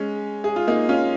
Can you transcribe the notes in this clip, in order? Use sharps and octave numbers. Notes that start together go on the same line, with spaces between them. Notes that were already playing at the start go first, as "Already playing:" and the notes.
Already playing: G#3 C#4
G#4
F4
A#3 D#4
C#4 F4